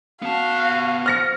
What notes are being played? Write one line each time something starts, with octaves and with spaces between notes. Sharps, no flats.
B3 F#4 F5 A5
F6 A#6 C#7